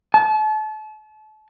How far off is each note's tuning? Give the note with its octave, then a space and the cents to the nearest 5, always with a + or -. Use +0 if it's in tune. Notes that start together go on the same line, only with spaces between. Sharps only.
A5 -35